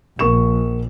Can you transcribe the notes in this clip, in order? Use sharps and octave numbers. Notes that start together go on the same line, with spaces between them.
A#1 A#3 C#6 E7